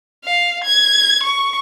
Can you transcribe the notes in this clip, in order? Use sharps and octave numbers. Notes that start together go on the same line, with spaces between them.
F5
G#6
C#6